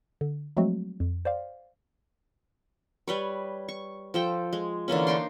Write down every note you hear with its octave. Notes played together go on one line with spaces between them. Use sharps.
D3
F3 F#3 G#3 A3 C4 F#4
F2
C5 D5 F5
G3 B4 C#5
C#6
F3 A4 G5
G#3
D3 E3 A#3 C#4
D4 D#4 G5 C6